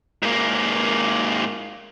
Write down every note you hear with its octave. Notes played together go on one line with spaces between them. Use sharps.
G#2 A#3